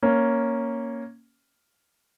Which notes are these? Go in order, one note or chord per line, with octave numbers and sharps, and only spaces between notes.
A#3 C#4